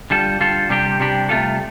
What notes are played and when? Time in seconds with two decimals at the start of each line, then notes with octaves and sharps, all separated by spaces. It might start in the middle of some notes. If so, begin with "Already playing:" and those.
0.10 D3 G3 F4 A4
0.40 D3 G3 F4 A4
0.70 C3 G3 D4 G4
1.00 C3 G3 D4 G4
1.29 C2 C3 A3 F4 A4